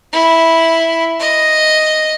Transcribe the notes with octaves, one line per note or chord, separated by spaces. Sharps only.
E4
D#5